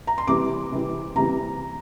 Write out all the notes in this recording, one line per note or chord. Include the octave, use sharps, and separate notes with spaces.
A#5
C6
C3 E3 G3 C4 D6
C3 E3 G3 C4
C3 E3 G3 C4 A#5